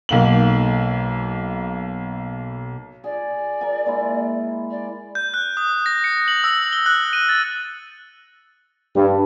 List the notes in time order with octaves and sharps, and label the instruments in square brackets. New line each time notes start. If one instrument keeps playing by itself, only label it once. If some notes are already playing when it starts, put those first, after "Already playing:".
[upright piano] B1 A#3 F#7
[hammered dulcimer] G#4 [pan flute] D5
[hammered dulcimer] A#4 G#5
G#3 A#3 E4
[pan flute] D5
[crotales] G6
F#6
D#6
A#6
C#7
F#7
E6
G7
F#6
D#7
A6
[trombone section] G2